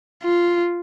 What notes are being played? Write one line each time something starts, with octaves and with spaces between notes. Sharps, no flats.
F4